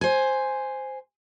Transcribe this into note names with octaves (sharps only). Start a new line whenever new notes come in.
C5 G#5